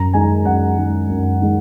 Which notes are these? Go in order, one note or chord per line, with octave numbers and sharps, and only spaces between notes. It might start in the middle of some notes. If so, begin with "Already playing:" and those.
Already playing: F#2 A#5
D#3 G#3 G#5
F#2 F#5
D#3 G#3
F#2
D#3 G#3